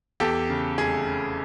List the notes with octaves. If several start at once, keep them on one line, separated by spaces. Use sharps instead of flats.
E2 G4 A4
C#3
F1 G#4
C#3